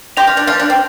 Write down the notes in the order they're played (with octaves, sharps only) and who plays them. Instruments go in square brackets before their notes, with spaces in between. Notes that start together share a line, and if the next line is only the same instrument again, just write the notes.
[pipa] G4 [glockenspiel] C6 G6 A#6 F7
[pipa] F4
D4
F3 F4
D4
C4